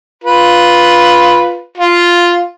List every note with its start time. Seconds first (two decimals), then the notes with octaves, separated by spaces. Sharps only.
0.24 F4 B4
1.78 F4